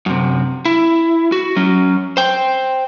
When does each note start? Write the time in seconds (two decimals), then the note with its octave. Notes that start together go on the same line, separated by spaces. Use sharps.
0.06 F#2 C3
0.65 E4
1.32 F#4
1.56 F#3 C#4
2.17 C5 G5